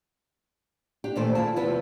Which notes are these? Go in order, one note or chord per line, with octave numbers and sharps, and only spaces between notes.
D4 G4
A#2 D#3 E3 A3 C5 D5
E4 F4 G#4 A5
E2 C3 F3 F4 B4